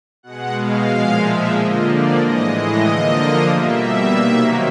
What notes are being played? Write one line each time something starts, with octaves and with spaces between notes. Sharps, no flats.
B2 G#3 F#5
F5
A#2 F3 G#3
E5
D3 F3 A#3 D#5
D5
A2 E3 G#3 D#5
D#5
D3 F3 A#3
B2 G3 A#3 E5
C3 D#3 F#3 A#3